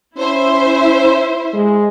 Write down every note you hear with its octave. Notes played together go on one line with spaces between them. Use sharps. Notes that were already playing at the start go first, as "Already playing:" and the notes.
C#4 E4 C5 E5
G#3